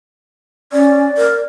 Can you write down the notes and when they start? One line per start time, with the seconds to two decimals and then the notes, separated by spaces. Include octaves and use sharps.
0.73 C#4 D5
1.17 A#4